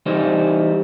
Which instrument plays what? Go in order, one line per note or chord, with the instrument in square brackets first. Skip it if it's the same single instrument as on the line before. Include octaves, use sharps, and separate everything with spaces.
[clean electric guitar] E3 G3 D#4 C5